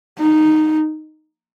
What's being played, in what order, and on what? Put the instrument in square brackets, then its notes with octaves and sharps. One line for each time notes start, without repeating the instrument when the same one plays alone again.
[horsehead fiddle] D#4